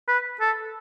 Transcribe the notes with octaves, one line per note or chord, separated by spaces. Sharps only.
B4
A4